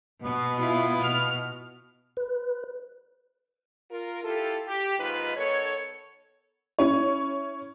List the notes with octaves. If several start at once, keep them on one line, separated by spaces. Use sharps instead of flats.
B2 B3
E4 F4
B2 F6
B4
F4 A#4
E4 F4 G4 A4
G4
D#2 G#2 D#3 D#4 F4 B4
D#3 B3 D#4 A4 C#5
C#4 E4 C#5